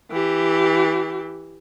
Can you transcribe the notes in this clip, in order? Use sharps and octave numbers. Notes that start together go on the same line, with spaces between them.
E3 G4